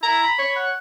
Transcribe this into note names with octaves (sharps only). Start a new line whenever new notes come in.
E4 A#5
B5
C#5
F#5